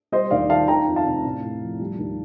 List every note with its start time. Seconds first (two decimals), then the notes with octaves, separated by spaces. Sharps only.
0.12 G3 C5 D#5
0.31 D#2 D5 F5
0.50 D#3 F5 A5
0.68 D#3 G5 A#5
0.88 F2
0.96 F5 A5
1.06 C3
1.24 A2
1.44 A2
1.61 F3
1.80 G3
1.99 D#2